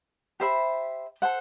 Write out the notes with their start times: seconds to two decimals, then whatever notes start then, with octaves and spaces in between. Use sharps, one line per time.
0.40 G4 C5 E5 B5
1.22 A4 C5 F#5